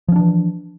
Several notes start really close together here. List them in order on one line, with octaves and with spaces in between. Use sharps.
F3 C#4 D4 E3